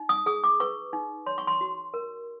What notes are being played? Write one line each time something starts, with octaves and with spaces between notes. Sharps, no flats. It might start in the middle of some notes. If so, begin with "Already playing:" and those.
Already playing: D#4
D#6
G#4 D#6
D6
B4 C#6
D#4
C#5 C6
C#6
C6
F#4
A#4